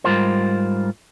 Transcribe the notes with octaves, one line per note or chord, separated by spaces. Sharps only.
G#2 G3 F4 A#4 C5